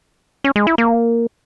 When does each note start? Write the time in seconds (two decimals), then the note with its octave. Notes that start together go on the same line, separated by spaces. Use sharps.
0.44 C#4
0.56 G#3
0.67 E4
0.78 A#3